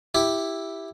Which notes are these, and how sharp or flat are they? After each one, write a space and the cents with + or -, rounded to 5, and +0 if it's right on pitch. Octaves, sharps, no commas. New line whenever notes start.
E4 +0 G4 +0